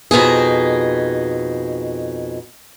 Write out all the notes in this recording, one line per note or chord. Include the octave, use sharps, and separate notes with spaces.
F2 B2 D#4 G#4